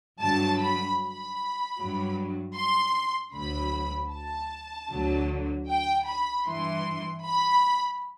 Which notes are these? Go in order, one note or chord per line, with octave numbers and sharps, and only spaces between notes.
G2 D3 F#3 A5
B5
B5
G2 F#3
C6
D2 D3 F#3 B5
A5
D2 D3 F#3
G5
B5
G2 E3 C6
B5